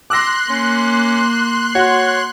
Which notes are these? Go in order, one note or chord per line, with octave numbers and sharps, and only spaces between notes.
C6 D6 E6 F#6 A#6
A#3 C#4
F#4 C#5